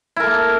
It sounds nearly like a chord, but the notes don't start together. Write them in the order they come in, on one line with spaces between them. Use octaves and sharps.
E4 A#4 A4 A#3